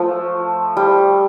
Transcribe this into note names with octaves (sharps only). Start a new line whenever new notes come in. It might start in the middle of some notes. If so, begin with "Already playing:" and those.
Already playing: F3 A3
G3